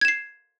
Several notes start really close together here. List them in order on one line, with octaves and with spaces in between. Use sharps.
G#6 E7 C7